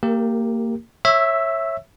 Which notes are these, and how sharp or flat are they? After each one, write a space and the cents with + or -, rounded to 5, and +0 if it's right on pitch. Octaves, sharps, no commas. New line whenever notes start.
A#3 -30 G4 +0 A#4 +0
C#5 -20 E5 +0 E6 +20